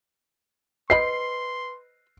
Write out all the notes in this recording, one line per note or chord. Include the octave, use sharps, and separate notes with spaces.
B4 C5 D#5 B5 C6 C7